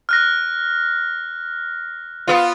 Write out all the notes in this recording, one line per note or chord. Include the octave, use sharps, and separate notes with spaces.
F6 F#6 A#6
B3 F4